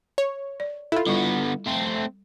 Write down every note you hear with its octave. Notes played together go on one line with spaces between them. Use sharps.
C#5
D5
E4 F4 A4
D3 G3 B3 C#6
A3 C4